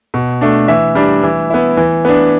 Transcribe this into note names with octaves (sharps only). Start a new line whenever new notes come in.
B2
A3 D4
E3 E5
G3 D4
E3
B3 E4
E3
B3 D4